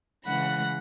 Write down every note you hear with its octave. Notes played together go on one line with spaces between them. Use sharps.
C#3 E3 G#3 F#5 B5 A#6